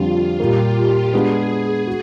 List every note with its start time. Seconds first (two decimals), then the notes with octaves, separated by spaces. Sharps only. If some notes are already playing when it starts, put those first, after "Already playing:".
Already playing: F2 D3 G3 F4
0.39 A#2 G3 A#3 G4
1.13 G#3 B3 D4 G#4
1.87 F#4